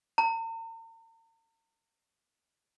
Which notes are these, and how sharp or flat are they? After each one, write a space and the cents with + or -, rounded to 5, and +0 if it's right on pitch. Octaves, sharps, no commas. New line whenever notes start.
A#5 -45